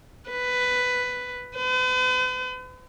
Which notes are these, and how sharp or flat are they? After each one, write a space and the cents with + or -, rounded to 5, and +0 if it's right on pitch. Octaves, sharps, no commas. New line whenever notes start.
B4 +10
B4 +45